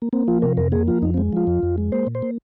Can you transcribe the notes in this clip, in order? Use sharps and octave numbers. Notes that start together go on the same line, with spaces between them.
A#3
A#3 C4
F3 F4
C3 A#4
F2 A#4
A#3 G#4
F3 F4
F2 D#4
C4
G#3
F3 F4
F2
F2
G#3
A#3 C5
A#2
C5
A#3